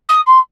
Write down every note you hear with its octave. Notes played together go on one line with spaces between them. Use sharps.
D#6
C6